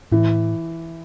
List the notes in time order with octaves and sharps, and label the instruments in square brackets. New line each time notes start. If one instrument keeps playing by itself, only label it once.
[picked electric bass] A2 [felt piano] E3